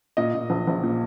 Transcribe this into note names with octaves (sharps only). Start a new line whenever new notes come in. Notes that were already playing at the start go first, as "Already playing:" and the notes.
A#2 D#5
A#2
A#1
A#1
A#2